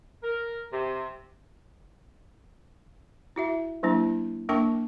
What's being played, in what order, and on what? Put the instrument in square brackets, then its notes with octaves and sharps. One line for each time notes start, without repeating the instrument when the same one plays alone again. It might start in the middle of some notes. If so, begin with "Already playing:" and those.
[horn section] A#4
C3
[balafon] E4 F#4 E5
F#3 A#3 D4 E4
A#3 D4 A#4 G5 C#6 D6